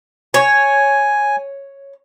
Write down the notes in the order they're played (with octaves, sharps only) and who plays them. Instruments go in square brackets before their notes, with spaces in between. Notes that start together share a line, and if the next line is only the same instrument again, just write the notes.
[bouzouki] C#5 [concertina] G#5